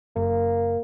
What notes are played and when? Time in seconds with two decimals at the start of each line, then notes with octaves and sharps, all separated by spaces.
0.16 F#1 A#3